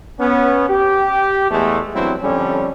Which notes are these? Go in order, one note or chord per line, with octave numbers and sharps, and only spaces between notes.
B3 C#4
G4
E2 G#3 A3
E2 G2 F#3 C4 E4
F2 D3 G3 C#4